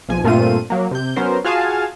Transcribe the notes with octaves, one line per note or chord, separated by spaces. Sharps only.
B1 F3 G#5
G2 A#2 A3 C4 F4 D#7
F#3 A#3
C3 G6
F#3 B3 C#4 A#4 C5
F4 F#4 G#4 F5 G#5 A5